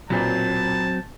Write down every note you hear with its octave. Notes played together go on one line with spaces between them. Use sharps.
B1 A#2 F#3 C4 A5